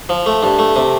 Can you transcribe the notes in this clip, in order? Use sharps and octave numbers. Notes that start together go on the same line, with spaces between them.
F3
A3
G2
A3
C3